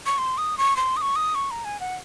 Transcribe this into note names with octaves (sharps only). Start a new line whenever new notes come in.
C#6
C6
D#6
C#6
C6
D#6
C#6
D#6
C#6
A#5
G#5
F#5